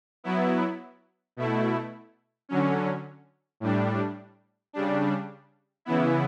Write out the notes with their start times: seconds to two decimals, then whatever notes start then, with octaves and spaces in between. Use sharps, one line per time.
0.24 F#3 B3 E4
1.37 B2 A3 E4
2.49 D3 F#3 C#4
3.60 A2 G3 D4
4.73 C#3 G3 D4
5.85 C#3 E3 B3 E4